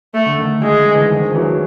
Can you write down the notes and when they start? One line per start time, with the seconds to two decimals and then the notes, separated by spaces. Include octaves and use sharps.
0.14 A3
0.26 D3
0.38 D#3
0.63 G#3
0.79 D#3
0.95 D3 E3
1.11 D#3 F3
1.29 F3
1.35 E3 F#3
1.50 F#3